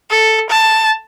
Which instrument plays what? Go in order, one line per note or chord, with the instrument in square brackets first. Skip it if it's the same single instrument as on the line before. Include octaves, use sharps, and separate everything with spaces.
[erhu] A4
A5